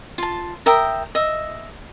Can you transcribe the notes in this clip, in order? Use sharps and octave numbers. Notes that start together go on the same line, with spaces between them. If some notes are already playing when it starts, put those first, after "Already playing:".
F4 A5
A#4 E5 G5 D#6
D#5 E5